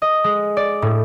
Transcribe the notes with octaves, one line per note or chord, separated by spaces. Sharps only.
D#5
G#3
D5
A2